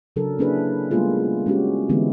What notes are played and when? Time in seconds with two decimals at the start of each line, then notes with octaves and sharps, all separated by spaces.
0.16 C#3 F#3 D4 A4 A#4
0.39 A#3 C#4 D4 E4 G#4 B4
0.91 G3 G#3 A#3 B3 F4 G#4
1.46 G#3 C#4 F#4 G4
1.89 D3 E3 G#3 B3 C4 E4